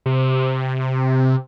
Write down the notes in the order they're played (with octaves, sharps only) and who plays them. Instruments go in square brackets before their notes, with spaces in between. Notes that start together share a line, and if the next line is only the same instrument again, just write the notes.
[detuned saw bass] C3